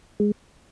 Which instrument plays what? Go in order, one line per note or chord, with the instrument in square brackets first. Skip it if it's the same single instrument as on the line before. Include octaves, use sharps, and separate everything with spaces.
[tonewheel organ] G#3